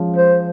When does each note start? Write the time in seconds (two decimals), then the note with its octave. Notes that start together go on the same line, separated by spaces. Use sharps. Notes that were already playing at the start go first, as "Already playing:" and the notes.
Already playing: F3 G#3 C#4
0.16 C5